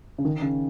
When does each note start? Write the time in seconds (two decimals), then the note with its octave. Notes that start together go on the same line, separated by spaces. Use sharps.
0.18 C#3
0.25 D#3
0.42 C#3